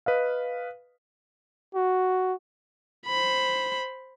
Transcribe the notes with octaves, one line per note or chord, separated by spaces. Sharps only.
B4 D#5 F5
F#4
C5 B5